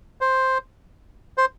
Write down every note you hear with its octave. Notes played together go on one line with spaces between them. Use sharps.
C5
C5